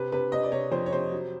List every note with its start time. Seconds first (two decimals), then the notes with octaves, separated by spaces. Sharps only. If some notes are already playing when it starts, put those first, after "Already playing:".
Already playing: C3 B4
0.12 C3 B4
0.32 C3 D#5
0.43 D5
0.52 C3 C#5
0.72 F2 C5
0.86 C#5
0.92 C3 C5
1.12 F#3